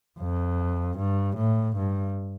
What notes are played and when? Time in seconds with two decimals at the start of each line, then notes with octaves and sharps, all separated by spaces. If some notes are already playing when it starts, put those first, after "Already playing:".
0.20 F2
0.98 G2
1.36 A2
1.76 G2